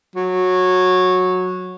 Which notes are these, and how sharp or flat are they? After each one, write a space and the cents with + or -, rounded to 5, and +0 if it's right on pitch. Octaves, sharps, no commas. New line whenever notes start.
F#3 -15